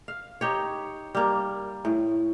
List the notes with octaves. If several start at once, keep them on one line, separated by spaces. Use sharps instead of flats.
F5
D#4 G4 C#5
G3 A#3
A2